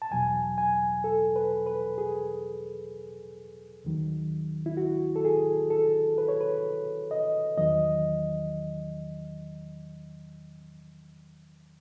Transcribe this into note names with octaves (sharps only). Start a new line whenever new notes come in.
A5
E2 B2 F#3 G#5
G#5
A4
B4
B4
G#4
D#2 D#3 F#3
E4
F#4
A4
G#4
A4
B4
C#5
B4
D#5
E2 D#3 F#3 D#5